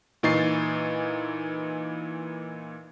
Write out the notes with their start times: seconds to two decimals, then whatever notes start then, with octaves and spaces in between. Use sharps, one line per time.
0.23 A#2 E3 D#4 C#6 A6 C7